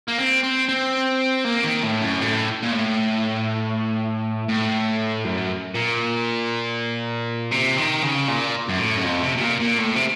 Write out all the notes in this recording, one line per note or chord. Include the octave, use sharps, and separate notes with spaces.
A#3
C4
C4
C4
A#3
D#3
A2
F#2
A2
A#2
A2
A2
F#2
A#2
C3
D#3
C#3
A#2
F#2
A2
F#2
F2
C3
C3
A#2
A#2
A2
C3